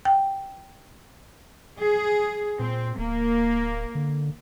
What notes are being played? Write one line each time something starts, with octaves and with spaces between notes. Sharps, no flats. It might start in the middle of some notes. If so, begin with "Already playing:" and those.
G5
G#4
A#2 C4
D1 A#3
D3